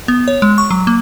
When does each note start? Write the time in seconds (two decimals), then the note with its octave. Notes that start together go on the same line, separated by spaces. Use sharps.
0.08 B3
0.28 C#5
0.42 G#3
0.58 C#6
0.71 F#3
0.87 A#3